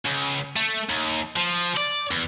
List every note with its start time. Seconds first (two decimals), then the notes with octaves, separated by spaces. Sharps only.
0.05 C#2
0.56 A3
0.89 D#2
1.36 F3
1.77 D5
2.11 E2